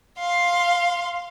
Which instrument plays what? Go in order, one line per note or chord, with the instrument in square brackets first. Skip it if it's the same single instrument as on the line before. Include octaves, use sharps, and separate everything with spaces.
[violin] F5 C6